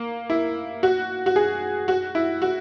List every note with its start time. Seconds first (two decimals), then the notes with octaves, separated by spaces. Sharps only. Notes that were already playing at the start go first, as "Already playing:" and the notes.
Already playing: A#3
0.30 E4
0.83 F#4
1.26 F#4
1.36 G#4
1.88 F#4
2.15 E4
2.42 F#4